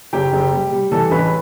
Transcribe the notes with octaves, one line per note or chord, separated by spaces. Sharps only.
F#1 G4 G5
F#1
G3
G3
E3 A4 A5
A1 B4 B5